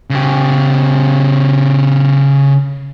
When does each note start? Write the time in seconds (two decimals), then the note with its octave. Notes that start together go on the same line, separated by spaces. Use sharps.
0.10 C#3 G4